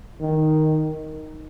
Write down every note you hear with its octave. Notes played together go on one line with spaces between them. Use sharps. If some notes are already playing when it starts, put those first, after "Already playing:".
D#3